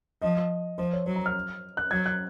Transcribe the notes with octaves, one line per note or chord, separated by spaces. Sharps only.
F3 D#5
F3 C5
C#5
F#3 C#5
A#5
F6
F#6
F#3 G#6
F#6